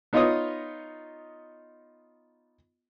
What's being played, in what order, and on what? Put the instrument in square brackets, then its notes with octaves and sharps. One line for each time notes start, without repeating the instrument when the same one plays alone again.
[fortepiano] B3 D#4 F4 C#5 D#5 D#6